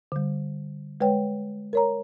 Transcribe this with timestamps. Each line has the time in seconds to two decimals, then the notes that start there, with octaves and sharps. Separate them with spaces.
0.12 D3 G3
1.01 G#3 B4 C#5 G5
1.73 A#4 C#5 A#5